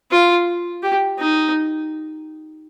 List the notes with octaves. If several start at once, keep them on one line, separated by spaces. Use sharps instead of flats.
F4
G4
D#4